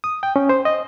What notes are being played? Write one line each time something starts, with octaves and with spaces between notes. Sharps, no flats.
D#6
G5
C#4
C5
D#5